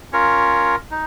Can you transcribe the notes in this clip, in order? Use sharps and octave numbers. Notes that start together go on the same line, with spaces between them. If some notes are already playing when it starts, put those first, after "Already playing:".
C#4 F4 A#4 C#5
D#4